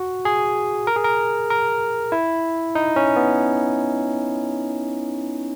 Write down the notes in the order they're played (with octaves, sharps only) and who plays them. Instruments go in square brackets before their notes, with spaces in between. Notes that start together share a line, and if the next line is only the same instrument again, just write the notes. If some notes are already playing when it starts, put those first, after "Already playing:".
Already playing: [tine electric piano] F#4
G#4
A#4
G#4
A#4
A#4
E4
D#4
C#4
B3